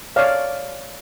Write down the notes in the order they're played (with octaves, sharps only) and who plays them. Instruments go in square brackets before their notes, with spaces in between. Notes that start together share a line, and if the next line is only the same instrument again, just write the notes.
[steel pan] C#5 D5 F5